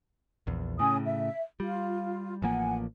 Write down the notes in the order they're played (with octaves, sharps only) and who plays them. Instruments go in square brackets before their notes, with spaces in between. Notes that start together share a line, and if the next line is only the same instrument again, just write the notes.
[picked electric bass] A#1 E2
[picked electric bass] A2 C#3 [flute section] C#4 G#5 D#6
[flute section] E5
[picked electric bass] G3 [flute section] F4
[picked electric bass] A1 F3 A#3 [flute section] F#5 G#5